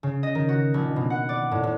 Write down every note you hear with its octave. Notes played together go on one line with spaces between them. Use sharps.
C#3
D#5
D#3
F#4
A#1
B2
F#5
D5
A2
A2